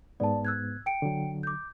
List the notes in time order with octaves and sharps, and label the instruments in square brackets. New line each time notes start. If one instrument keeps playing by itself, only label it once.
[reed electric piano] G#2 B3 [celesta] D5 A5
[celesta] E6 F#6 G#6
G5 C#7 D7
[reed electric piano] D3 F#3
[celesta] D6 G6